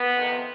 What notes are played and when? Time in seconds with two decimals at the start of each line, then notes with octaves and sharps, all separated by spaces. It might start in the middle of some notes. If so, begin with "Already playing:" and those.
Already playing: B3
0.14 F2 C3 D#3